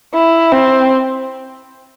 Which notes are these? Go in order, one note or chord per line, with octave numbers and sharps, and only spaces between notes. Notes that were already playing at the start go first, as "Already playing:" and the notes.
E4
C4